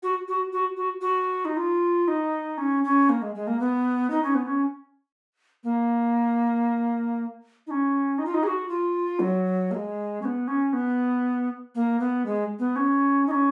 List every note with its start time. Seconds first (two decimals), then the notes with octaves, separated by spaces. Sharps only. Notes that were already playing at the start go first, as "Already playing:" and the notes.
0.03 F#4
0.28 F#4
0.53 F#4
0.77 F#4
1.01 F#4
1.45 D#4
1.57 F4
2.08 D#4
2.58 C#4
2.84 C#4
3.09 A#3
3.22 G#3
3.35 G#3
3.47 A#3
3.60 B3
4.10 D#4
4.23 C#4
4.35 B3
4.47 C#4
5.64 A#3
7.67 D#4
7.71 C#4
8.18 D#4
8.26 F4
8.34 D#4
8.43 G#4
8.47 F#4
8.69 F4
9.20 F#3
9.71 A#3
9.74 G#3
10.22 C#4
10.25 B3
10.48 C#4
10.73 B3
11.75 A#3
12.00 B3
12.26 G#3
12.59 B3
12.76 C#4
13.27 D#4
13.31 C#4